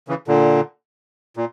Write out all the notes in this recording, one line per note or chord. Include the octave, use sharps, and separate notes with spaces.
C#3 E3
A#2 D3
A#2